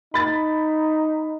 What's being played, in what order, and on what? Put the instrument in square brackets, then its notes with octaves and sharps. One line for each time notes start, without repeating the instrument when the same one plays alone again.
[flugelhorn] D#4 [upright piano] B5 A6